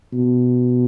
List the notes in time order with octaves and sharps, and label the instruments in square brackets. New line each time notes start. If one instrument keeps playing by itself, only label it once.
[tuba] B2